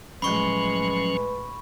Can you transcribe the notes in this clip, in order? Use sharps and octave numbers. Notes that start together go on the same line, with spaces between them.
A2 F3 F#3 G#3 C#4 B4 B5 C#6